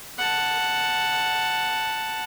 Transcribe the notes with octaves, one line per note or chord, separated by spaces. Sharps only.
F#5 A5